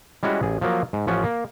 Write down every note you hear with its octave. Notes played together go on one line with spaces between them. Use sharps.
G3 G#3 C#4 E4 F#4
A1 G#4
F3 F#3 A#3
G#2
A1 F3 C#4 F#5
A#3